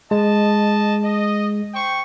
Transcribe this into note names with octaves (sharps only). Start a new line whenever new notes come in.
G#3 D#5 A5
D#5
C5 G5 C#6